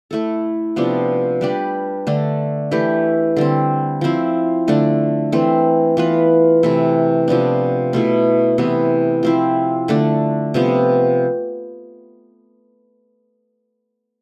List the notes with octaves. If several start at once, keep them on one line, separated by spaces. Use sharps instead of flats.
A3 E4 A4
C3 F3 B3 D4
G3 D4 G4 B4
D3 A3 D4
E3 A3 E4 G4
D3 G3 C4
F3 C4 E4
D3 A3 D4
E3 A3 C4
E3 B3 F4 B4
C3 E3 A3 E4
C3 F3 B3 D4
B2 A3 E4
C3 E3 B3
F3 C4 E4
D3 A3 D4
C3 F3 B3